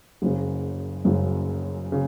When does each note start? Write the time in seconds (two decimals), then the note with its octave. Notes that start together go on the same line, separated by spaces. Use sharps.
0.22 F#1 F#2 C#3
1.05 F#1 F#2 C#3
1.92 C#3